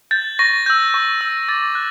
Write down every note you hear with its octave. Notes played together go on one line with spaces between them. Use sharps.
G6 A6
C#6 A#6
E6 G6
C#6
E6 G6
D6 A6
F#6